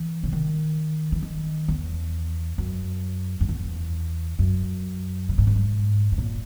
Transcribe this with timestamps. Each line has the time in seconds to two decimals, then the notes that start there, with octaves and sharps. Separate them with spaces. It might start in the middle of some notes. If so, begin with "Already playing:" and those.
Already playing: E3
0.23 C#3
0.33 D#3
1.12 E3
1.23 D#3
1.68 E2
2.58 F#2
3.41 F#2
3.49 E2
4.39 F#2
5.29 A#2
5.38 G#2
5.47 F#2
5.56 G#2
6.12 G#2
6.18 A#2